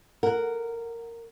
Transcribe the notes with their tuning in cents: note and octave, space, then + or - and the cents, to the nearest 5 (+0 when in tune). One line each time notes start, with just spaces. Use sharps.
A#4 -10 F#5 +0